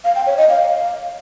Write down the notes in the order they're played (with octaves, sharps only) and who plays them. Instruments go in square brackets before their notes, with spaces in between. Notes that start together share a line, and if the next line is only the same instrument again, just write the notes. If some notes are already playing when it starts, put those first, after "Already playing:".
[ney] F5
G5
C#5
D#5
F5